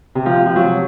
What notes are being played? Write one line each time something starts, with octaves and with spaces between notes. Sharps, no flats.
C3
F3
F3
F#3